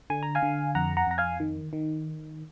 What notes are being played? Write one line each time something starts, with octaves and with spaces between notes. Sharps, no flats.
D3 G#5
A#5
F5 G#5
D3
F2 F#5 A#5
F#5 A#5
F2 A#5
F5 G#5
D#3
D#3